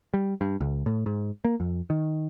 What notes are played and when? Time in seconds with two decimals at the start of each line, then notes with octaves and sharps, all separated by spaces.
0.14 G3
0.41 G2
0.60 C#2
0.86 A2
1.06 G#2
1.45 A#3
1.60 F2
1.90 D#3